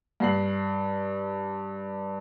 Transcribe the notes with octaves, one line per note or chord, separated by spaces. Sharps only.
G2 C7 F#7